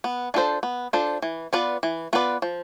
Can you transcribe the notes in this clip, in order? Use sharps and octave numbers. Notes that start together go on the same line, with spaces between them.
B3
D4 F4 A4 C5
B3
D4 F4 A4 C5
E3
B3 F4 B4 D5
E3
B3 F4 B4 D5
F3